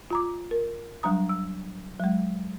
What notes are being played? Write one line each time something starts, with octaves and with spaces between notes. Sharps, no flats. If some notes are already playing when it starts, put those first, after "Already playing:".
F4 A#5 D6
A#4
F#3 G3 D4 A#5 D#6
E6
F#3 G#3